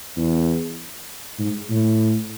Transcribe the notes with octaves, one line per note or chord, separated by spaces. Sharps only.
E2
G#2
A2